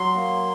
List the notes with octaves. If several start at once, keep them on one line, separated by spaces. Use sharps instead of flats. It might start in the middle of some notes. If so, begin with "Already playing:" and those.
Already playing: F#3 C6
A#3